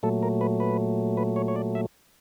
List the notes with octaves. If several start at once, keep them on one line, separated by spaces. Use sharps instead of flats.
A#2 F#3 A3 A4
A#4
B4
B4
B4
C#5
C#5
D5
E5